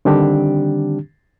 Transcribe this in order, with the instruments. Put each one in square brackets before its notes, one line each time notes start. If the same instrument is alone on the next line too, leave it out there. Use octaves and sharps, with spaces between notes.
[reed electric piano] D3 D#3 G3 C4 D4 G4